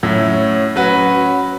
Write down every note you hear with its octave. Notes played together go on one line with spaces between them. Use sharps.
A2 F#3 C#4 E4
F#3 C#4 F#4 B4